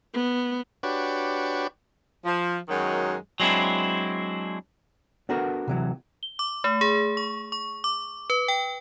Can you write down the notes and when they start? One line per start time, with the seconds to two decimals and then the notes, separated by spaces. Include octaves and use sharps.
0.14 B3
0.83 D4 F#4 G4 B4 C#5
2.25 F3
2.68 F#2 D#3 F#3 G#3
3.40 F#3 G#3 C4 D4 E4
5.29 B3 D4 F#4 A4 A#4
5.68 C3 E3 F#3
6.23 G7
6.39 D6
6.64 A3
6.81 G#4
7.17 C#6
7.52 C#6
7.84 D6
8.30 B4
8.48 G5